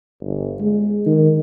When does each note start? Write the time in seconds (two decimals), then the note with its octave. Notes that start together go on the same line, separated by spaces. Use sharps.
0.21 G1
0.61 G#3
1.06 D#3